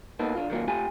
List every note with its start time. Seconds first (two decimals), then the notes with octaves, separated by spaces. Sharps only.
0.19 A#3 B3 D#4 A4
0.35 D3 F4
0.50 D#3 F#3 A#3 F4
0.68 A3 F4 G4 G#5